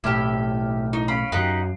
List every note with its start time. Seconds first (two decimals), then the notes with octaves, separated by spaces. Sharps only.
0.04 B1 A2 E4 G4 D6 F6
0.93 D#4 E4
1.08 C#4 F5 B5 C7
1.32 F#2 F#3 D#4 G4 F#5